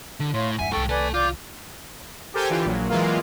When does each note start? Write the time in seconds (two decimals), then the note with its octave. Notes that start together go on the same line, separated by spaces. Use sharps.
0.20 D3
0.34 A2 C#5 F5 C6
0.59 E2 G2 E5 F#5 G#5
0.72 C2 G#2 D#3 A4 G5 C#6
0.89 A3 A4 B4 D5 G#5
1.14 F4 D5 D6 G6
2.34 G4 A4 A#4 C5 G5 G#5
2.49 D3 E3 F4 G4
2.65 A#1 A#2 F#3
2.90 E3 F#3 G#3 A#3 F4